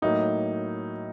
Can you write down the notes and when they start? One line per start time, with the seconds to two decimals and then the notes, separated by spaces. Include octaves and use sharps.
0.02 A2 F#3 A#3 D#4